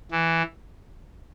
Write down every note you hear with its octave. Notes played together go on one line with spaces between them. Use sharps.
E3